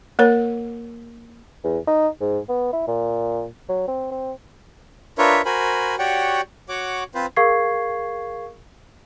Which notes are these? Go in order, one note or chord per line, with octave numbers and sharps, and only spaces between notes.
A#3 A#4 C#5
E2
D#4
G#2
B3
E4
A#2
F#3
C4
C4
D4 F4 A#4 B4 C#5 E5
F#4 A#4 C5 G#5 B5
F#4 G4 C#5 D5 F#5 G5
F#4 C#5 F#5 D6
C4 F4 B4 C5
G#4 A#4 F5 C#6 G#6 C7